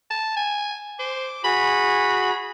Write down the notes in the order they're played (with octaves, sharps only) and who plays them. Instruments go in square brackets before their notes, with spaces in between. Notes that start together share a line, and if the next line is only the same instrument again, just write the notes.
[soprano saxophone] A5
G#5
[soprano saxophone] C5 [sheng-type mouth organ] D6
[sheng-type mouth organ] F#4 G#4 [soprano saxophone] B5